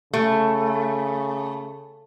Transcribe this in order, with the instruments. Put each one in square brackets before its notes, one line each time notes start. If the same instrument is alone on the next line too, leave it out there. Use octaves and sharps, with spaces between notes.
[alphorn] C#3 [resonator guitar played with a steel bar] A3